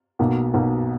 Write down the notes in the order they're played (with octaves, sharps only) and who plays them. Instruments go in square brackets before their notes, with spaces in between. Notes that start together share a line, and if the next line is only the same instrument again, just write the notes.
[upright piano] B1 B2 A#3
B1 B2 A#3